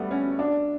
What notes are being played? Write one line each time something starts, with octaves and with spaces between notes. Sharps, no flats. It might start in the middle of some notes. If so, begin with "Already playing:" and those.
Already playing: G3 A3 B3
C#4
D4